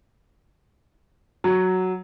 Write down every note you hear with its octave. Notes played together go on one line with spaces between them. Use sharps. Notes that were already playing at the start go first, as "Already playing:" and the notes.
F#3